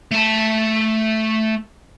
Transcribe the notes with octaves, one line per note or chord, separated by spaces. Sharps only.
A3 A5